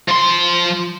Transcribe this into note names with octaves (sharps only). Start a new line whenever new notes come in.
F3 C6